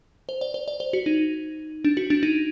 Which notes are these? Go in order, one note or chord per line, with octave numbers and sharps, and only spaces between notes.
C5
D5
C5
D5
C5
F#4
D#4
D4
F#4
D4
D#4